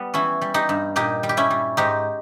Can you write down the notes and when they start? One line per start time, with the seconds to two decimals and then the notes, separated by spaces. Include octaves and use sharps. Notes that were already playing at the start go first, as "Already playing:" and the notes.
Already playing: G3 B3
0.14 E3 C#4 E4
0.41 G3
0.54 D#4 G4
0.69 G2
0.96 A#2 D#4 G4
1.23 G3
1.29 G4
1.37 C#4 E4
1.50 G3
1.77 G#2 D#4 G4